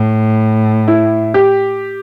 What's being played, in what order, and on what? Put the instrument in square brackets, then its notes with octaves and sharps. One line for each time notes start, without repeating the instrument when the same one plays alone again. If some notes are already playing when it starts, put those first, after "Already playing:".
Already playing: [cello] A2
[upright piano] E4
G4